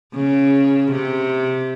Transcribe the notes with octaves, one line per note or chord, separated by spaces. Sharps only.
C#3
C3